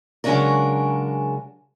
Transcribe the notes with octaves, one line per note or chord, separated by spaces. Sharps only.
C#3 F#3 G#3 C#4 D4 A#4